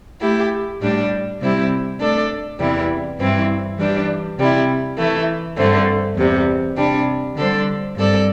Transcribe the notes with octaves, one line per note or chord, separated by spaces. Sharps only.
A3 E4 G4
A2 G3 D4 G4
C3 G3 C4 E4 G4
A3 D4 A4 D5
E2 C3 E3 G3 E4
G2 E3 C4 E4
E3 G3 D4 G4
C3 G3 E4
E3 A3 E4
G2 D3 A3 C4
E2 C3 G3
C3 G3 D4
D3 G3 D4 A4 C5
G2 G3 C4 A4 D5